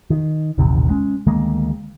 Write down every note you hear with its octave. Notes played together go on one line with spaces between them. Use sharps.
D#3
D#1 A1 C3 D#3
G#3 C#4
D2 D#3 G#3 A#3